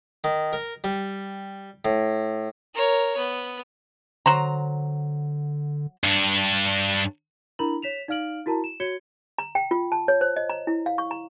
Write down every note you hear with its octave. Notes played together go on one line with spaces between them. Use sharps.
D#3
A#4
G3
A2
A#4 C#5
B3
D3 F#3 C5 A#5
G2 D4
D4 E4 A#4 A#5 B5 F#7
C#5 B6 E7 F7
D#4 D5 F5 F6 D7 F#7
E4 F#4 A#4 A5 A#5
E7
F#4 C#5 G#6 C#7 G7
A#5
G5
F4
A5
C#5
C5
D#5
A#5
E4
F5
C#6
A#5